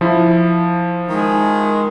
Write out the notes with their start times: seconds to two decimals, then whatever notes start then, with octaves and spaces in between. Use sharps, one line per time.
0.01 F3 E4
1.09 D#3 G#3